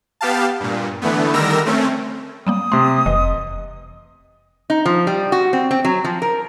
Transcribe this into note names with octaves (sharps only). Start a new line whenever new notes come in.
B3 G4 F5 A5
G2 A#2
D3 E3 A3 B3
D3 D#3 G3 A#4 E6 A#6
A3 C4 C#4
F#3 G3 A#3 D#6
C3 A3 C6
F1 E3 D#5
D#4
F3
G3
F#4
C4
C4
F#3
F3
A#4